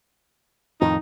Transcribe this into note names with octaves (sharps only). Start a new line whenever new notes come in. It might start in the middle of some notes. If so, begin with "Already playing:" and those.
F2 A2 D#3 D#4